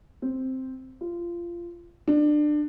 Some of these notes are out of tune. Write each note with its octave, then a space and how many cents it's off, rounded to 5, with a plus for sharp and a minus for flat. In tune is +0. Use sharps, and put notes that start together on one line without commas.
C4 +0
F4 -20
D4 +25